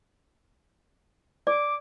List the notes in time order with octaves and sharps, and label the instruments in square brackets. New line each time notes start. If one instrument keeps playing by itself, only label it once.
[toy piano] D5 [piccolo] D6